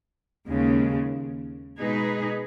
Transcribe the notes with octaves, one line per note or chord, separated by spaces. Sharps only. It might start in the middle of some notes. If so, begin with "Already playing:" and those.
D#2 C#3 G#3
B2 G#3 D#4 G#4 B4